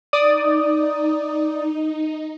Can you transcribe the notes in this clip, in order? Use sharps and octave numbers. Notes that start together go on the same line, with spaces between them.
D#4 D5 D#6